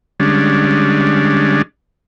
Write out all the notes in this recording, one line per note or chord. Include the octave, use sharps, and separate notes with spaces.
D3 G3 G#3 C#4 D4